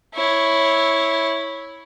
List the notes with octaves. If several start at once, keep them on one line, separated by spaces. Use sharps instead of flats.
E4 C#5